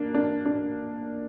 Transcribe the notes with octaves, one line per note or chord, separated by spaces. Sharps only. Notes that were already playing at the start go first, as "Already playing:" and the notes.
Already playing: A#3 D4
D4
D4